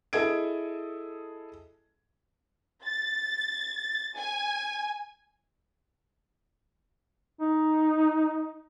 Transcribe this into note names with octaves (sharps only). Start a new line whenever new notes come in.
E4 G#4 A4 D#5 G#6 D7
A6
G#5
D#4